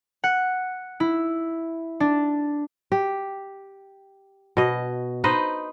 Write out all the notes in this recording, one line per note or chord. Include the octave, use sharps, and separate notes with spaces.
F#5
E4
D4
G4
B2 D#5
D#4 B4 C5 D#5